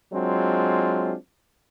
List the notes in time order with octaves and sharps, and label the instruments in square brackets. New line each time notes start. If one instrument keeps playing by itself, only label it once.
[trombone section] F#3 G#3 C4 D4 F4